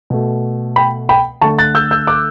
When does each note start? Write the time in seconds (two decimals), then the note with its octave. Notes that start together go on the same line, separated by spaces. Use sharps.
0.10 B2 A3
0.76 G5 B5
1.09 G5 B5
1.41 D3 A3 A5 C#6
1.58 F#6 A6
1.75 E6 G6
1.91 E6 G6
2.07 D6 F#6